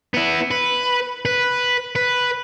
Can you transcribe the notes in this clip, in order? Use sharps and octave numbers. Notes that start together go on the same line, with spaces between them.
B3 E4
B4
B4
B4